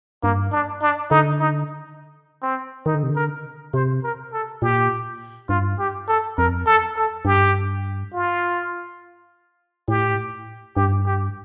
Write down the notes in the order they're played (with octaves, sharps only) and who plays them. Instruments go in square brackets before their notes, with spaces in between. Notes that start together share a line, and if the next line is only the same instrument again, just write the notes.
[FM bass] G2 [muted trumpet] A#3
[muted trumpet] D4
D4
[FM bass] D3 [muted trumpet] D#4
[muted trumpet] D#4
C4
[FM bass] D#3 [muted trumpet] D#4
[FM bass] D3
C3
D3
[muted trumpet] A#4
[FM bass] C3 [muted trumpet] C5
[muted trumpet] A#4
A4
[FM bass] A#2 [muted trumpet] G4
[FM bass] G2 [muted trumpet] F4
[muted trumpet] G4
A4
[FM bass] F2 [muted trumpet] A#4
[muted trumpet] A4
A4
[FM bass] G2 [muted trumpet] G4
[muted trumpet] F4
[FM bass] A2 [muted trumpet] G4
[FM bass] G2 [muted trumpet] G4
[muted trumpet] G4